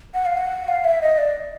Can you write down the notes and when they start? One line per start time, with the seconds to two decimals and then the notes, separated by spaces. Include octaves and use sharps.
0.14 F#5
0.26 F5
0.37 F#5
0.68 F5
0.84 E5
1.02 D#5
1.18 D5